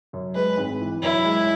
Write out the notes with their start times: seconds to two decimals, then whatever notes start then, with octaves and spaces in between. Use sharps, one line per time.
0.13 F#2
0.35 G#3 B4
0.57 G#1
0.81 E3
1.02 F#2 E4
1.25 G#3